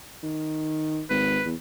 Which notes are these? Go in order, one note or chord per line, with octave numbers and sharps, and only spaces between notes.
D#3
G#1 B4
E2